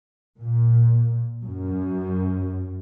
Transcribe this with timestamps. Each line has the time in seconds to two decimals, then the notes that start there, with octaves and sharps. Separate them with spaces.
0.39 A#2
1.43 F#2